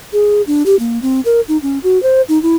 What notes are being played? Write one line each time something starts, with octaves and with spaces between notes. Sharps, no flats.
G#4
D4
G4
A#3
C4
A#4
D#4
C#4
F#4
C5
D#4
E4